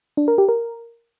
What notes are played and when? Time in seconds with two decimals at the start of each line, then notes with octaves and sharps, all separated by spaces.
0.17 D4
0.28 A#4
0.38 G4
0.49 A#4